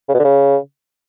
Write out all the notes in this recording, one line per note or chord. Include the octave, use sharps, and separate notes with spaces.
C#3
B2
D3
C#3